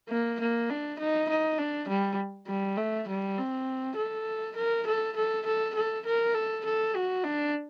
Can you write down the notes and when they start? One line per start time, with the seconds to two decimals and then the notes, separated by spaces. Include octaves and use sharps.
0.09 A#3
0.40 A#3
0.70 D4
0.99 D#4
1.29 D#4
1.58 D4
1.88 G3
2.47 G3
2.77 A3
3.08 G3
3.38 C4
3.96 A4
4.56 A#4
4.87 A4
5.16 A4
5.46 A4
5.75 A4
6.06 A#4
6.34 A4
6.65 A4
6.95 F#4
7.24 D4